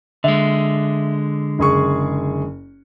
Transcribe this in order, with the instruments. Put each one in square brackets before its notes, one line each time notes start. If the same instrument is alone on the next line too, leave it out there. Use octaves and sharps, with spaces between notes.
[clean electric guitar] D3 G#3 [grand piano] E5
[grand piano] F#1 G#4 C#6